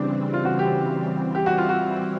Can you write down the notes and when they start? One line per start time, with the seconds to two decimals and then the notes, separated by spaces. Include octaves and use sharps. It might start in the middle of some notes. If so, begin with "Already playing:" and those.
Already playing: C#3 E3 G3 C4 D4
0.34 F4
0.45 F#4
0.59 G4
1.35 E3 G3 C4 E4 G4
1.46 F#4
1.58 F4
1.69 F#4